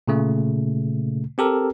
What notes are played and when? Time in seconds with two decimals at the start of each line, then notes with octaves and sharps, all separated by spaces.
0.08 A#2 C#3 A3
1.38 C4 G4 A4 A#4